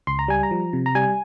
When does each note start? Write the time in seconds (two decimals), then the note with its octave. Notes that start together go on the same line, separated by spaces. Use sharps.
0.07 C#2 C6
0.19 A#5
0.28 G3 G#5
0.43 A#5
0.51 F3
0.73 C3
0.86 A#5
0.95 G3 G#5